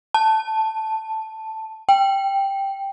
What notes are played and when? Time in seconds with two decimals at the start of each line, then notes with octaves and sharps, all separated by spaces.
0.14 A5
1.89 G5